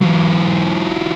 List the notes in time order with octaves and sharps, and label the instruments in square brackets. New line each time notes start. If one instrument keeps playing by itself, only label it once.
[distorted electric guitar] E3 F#3